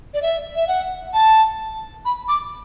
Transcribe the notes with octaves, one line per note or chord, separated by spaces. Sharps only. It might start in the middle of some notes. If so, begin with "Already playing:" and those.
D5
E5
E5
F#5
A5
B5
D6